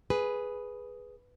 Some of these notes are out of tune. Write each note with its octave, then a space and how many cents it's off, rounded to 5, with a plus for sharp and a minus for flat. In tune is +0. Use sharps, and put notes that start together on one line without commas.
G#4 +0 B4 +0